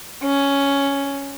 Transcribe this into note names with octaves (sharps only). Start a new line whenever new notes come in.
C#4